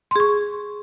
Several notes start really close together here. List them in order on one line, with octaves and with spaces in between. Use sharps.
C6 G#4 C#6